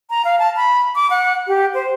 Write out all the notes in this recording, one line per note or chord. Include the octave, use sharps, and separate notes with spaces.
A#5
F5
A5
B5
D6
F#5
G4
C5